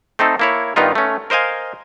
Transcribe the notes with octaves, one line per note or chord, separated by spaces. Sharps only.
A3 C4 D#4 A4
A#3 E4 C#5
G2 D#3 B3 D#4 F4
A3 C#4
A#4 C5 D#5 F5 G#5